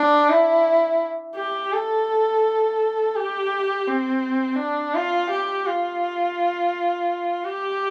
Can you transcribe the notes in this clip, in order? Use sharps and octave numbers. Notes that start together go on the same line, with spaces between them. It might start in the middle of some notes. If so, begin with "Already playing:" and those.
Already playing: D4
E4
G4
A4
G4
C4
D4
F4
G4
F4
G4